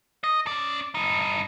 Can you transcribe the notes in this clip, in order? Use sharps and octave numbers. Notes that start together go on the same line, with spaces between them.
D#5
C#4 D5
G2 D#4